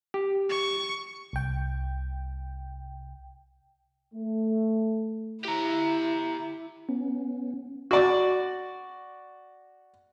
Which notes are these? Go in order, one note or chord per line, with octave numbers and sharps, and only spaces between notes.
G4
C#6
C2 G5
A3
E4 G4 A#5
B3 C#4
F#4 D5